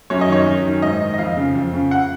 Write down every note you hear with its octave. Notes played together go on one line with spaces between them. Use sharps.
F#2 C#5
D#5
D#3 C#5
F#2
D#3
G#2 D#5
D#3
D#5
F2 F5
C#3
F2
C#3
F#5